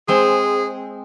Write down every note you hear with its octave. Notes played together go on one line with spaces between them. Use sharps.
G#3 C4 G#4